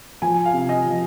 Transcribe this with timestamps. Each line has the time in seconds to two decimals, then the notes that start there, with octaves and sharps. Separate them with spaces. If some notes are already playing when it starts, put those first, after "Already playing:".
0.22 F3 G#5
0.45 F5
0.54 C3
0.69 D#5
0.84 F3